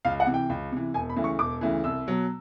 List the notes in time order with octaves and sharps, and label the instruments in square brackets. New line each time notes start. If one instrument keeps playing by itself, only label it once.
[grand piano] C#2 F5
F#5
C3 E3
G5
C#2
C3 E3
E1 G#5
B5
D2 C#3 E3
C#6
E1 D6
D2 C#3 E3
C2 E6
B2 F#3